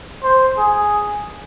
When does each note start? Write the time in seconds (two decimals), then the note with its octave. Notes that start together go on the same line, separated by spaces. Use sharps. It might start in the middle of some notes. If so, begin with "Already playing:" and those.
0.23 C5
0.58 G#4